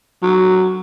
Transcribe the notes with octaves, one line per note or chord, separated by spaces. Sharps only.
F#3